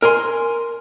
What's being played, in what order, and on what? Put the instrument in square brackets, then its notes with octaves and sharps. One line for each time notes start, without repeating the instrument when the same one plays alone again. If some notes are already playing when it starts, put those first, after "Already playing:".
[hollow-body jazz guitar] A#4 G#5 C6